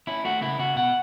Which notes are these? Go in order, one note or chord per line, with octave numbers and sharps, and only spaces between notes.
C#4 E4
A3 F#4
C#3 E4
C#3 F#4
B2 F#5